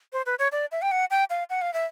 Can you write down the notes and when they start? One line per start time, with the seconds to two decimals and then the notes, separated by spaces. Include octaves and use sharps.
0.13 C5
0.26 B4
0.39 C#5
0.52 D5
0.72 E5
0.82 G5
0.91 F#5
1.11 G5
1.30 F5
1.50 F#5
1.61 F5
1.73 E5